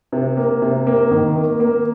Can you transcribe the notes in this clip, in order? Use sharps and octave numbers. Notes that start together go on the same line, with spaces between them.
C3
A#3
C3
A#3
D#3
A#3
A#3